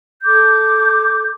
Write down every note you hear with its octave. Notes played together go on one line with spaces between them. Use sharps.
A4 D6 G6